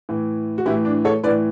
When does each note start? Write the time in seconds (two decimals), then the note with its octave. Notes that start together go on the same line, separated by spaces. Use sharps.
0.09 A2 E3
0.58 F#4
0.66 A2 E3 E4 G4
0.85 D4
1.05 A4 C#5
1.23 E3 B4 D5
1.27 A2